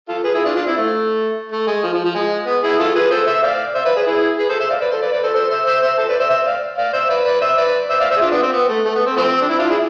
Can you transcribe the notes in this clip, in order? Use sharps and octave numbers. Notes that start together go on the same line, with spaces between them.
F4 A4
G#4 B4
E4 G#4
D4 F4
D4 F4
C4 E4
A3
A3
G#3
F3
F3
F3
G#3
B3
E4 G#4
F4 A4
G#4 B4
A4 C5
C5 E5
D5 F5
C5 E5
B4 D5
G#4 B4
E4 G#4
G#4 B4
A4 C5
C5 E5
D5 F5
B4 D5
A4 C5
B4 D5
B4 D5
A4 C5
A4 C5
C5 E5
C5 E5
C5 E5
A4 C5
B4 D5
C5 E5
C5 E5
D5 F5
D5 F5
C5 E5
B4 D5
B4 D5
C5 E5
B4 D5
C5 E5
D5 F5
C5 E5
G#4
D4 F4
B3 D4
C4
B3
A3
A3
B3
C4
F3 A3 C4
D4
C4 E4
D4 F4
E4 G#4